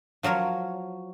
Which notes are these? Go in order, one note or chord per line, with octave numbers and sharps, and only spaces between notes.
F3 F#3 A#4 C#5